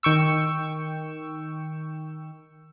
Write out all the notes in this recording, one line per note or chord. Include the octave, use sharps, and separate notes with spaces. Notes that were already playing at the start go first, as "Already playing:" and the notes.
D#3 G5 C#6 E6